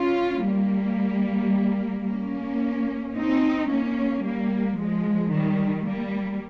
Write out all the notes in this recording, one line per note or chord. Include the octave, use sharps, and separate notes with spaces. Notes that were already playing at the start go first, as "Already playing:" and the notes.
Already playing: C#4 F4
G3 A#3
A#3 C#4
C4 D#4
A#3 C#4
G3 A#3
F3 G#3
D#3 G3
G3 A#3